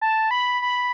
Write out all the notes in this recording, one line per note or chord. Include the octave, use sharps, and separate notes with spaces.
A5
B5
B5